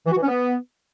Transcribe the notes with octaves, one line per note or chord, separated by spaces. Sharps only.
E3
F#4
E3
C#4
B3